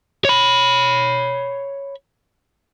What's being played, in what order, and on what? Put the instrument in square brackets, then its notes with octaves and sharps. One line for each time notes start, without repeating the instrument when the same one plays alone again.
[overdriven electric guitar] C#5 B5